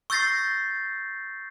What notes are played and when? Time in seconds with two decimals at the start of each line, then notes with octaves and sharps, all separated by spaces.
0.10 C#6 E6 G6 A6 A#6 C7